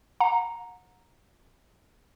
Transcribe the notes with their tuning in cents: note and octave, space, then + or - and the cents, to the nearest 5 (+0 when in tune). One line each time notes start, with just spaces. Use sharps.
F#5 -30 A#5 +0